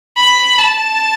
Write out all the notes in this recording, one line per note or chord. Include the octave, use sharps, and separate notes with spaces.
B5
A5